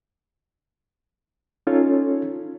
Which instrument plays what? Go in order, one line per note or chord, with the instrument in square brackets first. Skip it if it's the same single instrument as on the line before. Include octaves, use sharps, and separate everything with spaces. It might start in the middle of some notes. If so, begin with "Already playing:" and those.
[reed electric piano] C#4 D#4 F4 A4 C#5